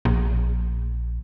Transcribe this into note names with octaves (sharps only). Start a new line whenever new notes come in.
A#1